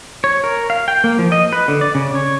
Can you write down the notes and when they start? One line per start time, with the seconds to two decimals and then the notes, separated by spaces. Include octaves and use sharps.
0.24 C#5
0.44 A#4
0.70 F5
0.88 G5
1.04 A#3
1.19 F3
1.32 D#5
1.53 B4
1.68 D3
1.81 D5
1.95 C#3
2.15 C#5